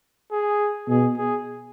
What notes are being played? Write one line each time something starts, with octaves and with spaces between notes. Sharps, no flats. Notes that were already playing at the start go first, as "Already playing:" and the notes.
G#4
B2 G#4
G#4